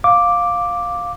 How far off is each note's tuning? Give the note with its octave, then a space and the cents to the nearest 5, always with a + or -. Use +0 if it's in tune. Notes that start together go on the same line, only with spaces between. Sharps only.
F5 +10 D6 +0